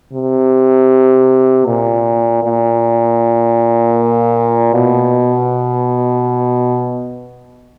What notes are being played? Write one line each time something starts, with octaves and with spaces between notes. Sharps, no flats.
C3
A#2
A#2
B2